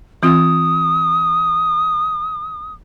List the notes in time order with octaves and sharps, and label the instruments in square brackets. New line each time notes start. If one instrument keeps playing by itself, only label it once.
[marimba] E3 C4 F4 [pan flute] D#6